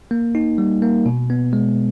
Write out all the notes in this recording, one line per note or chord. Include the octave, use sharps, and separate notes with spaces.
A#3
D#4
G3
A#3
B2
B3
G#3